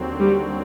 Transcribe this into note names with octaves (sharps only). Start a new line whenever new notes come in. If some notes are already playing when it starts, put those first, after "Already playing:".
Already playing: D#2 D3 F#3 C4
G3